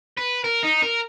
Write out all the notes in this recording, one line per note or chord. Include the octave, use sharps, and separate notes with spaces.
B4
A#4
D#4
A#4